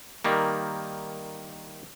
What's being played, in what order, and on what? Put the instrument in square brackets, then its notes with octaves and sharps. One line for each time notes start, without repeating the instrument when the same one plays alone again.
[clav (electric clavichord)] D#3 G3 A#3